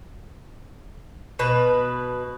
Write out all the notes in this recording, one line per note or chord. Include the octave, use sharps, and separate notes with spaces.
B2 B4